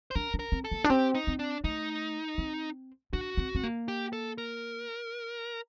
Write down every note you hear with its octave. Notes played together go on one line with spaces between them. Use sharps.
C5
D4 A#4
D4
A#4
C4
A4
A#3
D4
C4 G4
D#4
C4
D4
A3 D#4
C4
D4 F#4
C4
C4
A#3
G4
A4
A#4